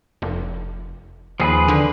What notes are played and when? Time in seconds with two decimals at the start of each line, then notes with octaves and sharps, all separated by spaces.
0.22 F1
1.40 D#2 F3 G#4 B4
1.68 D3